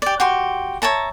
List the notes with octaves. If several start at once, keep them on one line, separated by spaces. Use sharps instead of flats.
G4 D5
F#4 G4 C6
C#5 E5 A5 A#5